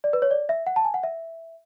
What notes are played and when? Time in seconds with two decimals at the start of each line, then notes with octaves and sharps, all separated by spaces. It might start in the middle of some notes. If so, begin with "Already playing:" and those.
0.04 D5
0.13 B4
0.22 C#5
0.31 D5
0.49 E5
0.66 F#5
0.76 A5
0.85 G#5
0.94 F#5
1.03 E5